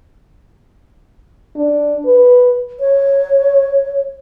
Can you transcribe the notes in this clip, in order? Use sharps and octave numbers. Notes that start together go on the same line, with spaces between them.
D4
B4
C#5